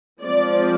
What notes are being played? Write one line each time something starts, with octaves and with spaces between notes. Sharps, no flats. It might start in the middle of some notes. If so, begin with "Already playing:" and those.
F3 G#3 C4 D5